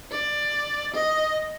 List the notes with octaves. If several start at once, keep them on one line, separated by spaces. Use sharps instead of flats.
D5
D#5